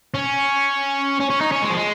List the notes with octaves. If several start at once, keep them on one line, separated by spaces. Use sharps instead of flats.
C#4
C#4
C#4
D#4
C#4
G#3
F3
G#3